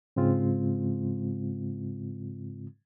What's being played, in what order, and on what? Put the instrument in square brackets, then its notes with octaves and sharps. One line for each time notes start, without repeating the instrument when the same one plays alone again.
[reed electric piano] G#2 C#3 G#3 C4 F4